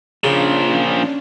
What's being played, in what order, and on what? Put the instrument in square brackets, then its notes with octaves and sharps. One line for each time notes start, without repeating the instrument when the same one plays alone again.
[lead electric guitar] A#2 F3 [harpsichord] C#3 [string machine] C#4 D4